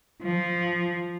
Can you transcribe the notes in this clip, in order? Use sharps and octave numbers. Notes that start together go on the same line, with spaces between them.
F3